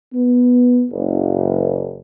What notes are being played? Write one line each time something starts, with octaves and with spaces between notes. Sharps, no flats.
B3
F#1